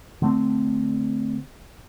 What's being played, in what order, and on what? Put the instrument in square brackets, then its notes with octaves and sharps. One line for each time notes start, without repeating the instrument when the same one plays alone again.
[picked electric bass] D3 A3 C4